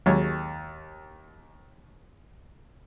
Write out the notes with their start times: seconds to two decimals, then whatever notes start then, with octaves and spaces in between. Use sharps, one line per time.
0.06 D#2 F#3 G#3 C#5